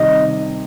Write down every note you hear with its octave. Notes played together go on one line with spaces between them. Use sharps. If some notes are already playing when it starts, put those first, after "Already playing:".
Already playing: C3 D#3 G3 D#5